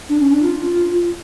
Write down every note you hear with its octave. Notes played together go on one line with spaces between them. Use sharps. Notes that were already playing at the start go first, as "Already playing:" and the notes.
D4
C#4
D4
F4